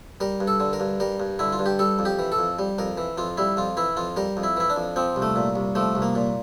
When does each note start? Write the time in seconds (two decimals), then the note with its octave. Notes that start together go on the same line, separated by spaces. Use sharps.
0.20 G3 A#4
0.40 G2
0.48 A4
0.60 D3
0.73 A#4
0.80 G2
1.00 G3 A#4
1.20 G2
1.39 D3 E4
1.52 F4
1.59 G2
1.66 G4
1.79 G3 A4
1.99 F2
2.05 G4
2.19 E3
2.32 A4
2.39 F2
2.59 G3
2.78 F2 A#4
2.98 E3
3.18 F2 F4
3.37 G3 E4
3.57 F2 F4
3.77 E3 E4
3.97 F2 F4
4.16 G3 A#4
4.37 F2
4.43 E4
4.57 E3 E4
4.70 D4
4.76 F2
4.96 F3 C4
5.16 C2
5.22 A3
5.36 A#2
5.56 C2
5.75 F3 A3
5.95 C2
6.02 A#3
6.15 A#2